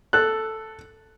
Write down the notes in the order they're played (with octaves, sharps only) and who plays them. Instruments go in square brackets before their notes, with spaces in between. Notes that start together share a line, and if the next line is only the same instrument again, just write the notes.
[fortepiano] A4 F#6